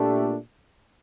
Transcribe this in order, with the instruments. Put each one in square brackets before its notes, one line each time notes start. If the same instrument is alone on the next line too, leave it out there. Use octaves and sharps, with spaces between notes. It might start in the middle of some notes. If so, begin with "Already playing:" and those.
Already playing: [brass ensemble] A#2 A3 D4 G4